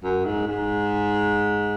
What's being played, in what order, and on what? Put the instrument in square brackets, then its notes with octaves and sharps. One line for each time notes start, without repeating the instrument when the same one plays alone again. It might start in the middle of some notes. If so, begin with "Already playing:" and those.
[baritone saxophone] F#2
G#2
G#2